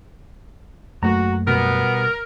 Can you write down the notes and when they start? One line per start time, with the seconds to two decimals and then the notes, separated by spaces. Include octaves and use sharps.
1.03 F#2 A3 A#3 F#4 A#5
1.47 B2 G3 B3 A#4